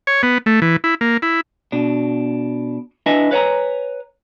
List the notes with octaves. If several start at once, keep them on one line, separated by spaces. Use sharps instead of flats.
C#5
B3
A3
E3
E4
A#3
E4
B2 D4
D4 E4 B4 D#5 E5 G#5
B4 C#5 F5 G#5 A#5